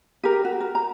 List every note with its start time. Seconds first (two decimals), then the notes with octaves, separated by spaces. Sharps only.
0.24 G4 A#4
0.45 F#4
0.60 A#4
0.75 A#5